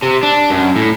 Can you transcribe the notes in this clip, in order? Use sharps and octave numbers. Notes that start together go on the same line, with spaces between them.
C3
D4
F#2
A2